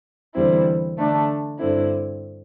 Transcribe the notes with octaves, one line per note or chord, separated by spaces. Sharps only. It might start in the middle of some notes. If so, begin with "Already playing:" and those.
E2 D3 G3 C4 E4
D3 A3 D4
G2 D3 C4 E4